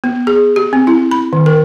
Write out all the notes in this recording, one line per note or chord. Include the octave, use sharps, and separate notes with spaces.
B3
G#4
G4
C4
E4
B5
D#3
A#4